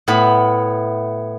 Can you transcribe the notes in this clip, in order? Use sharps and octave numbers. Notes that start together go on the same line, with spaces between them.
A2 B3 B5